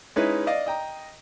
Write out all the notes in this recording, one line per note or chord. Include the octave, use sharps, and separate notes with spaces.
G#3 C#4 D#4 E4 B4
D5 D#5 F5
D#5 G5 A#5